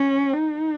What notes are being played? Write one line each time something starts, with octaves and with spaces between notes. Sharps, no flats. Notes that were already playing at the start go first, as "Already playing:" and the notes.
Already playing: C#4
D#4